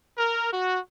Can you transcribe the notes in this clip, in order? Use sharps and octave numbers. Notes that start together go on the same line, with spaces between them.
A#4
F#4